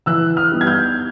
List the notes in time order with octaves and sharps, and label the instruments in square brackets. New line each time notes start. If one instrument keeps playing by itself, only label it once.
[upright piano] E3 E6 F#6
D#6 F6
G3 B3 D#4
G#6
F6 G6